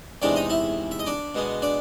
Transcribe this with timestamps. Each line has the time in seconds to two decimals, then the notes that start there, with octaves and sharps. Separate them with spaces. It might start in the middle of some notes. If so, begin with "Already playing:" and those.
0.22 E2 C3 D#3 G#3 D4 D5
0.36 D#4 D#5
0.50 E4 E5
0.91 E5
0.99 D#5
1.06 D4 D5
1.35 B2 G#3 B3
1.62 D4 D5